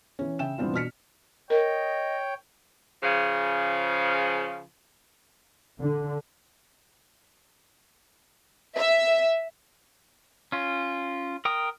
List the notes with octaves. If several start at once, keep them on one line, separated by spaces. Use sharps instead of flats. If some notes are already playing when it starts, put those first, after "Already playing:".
E3 C#4
C#3 E5 G5 E7
G2 E3 B3 C4 D4 F4
B2 D4 F6 B6 C#7
A#4 C#5 D#5 G5
C#3 F3
D3
E5
C#4 F4
A#4 G5 D#6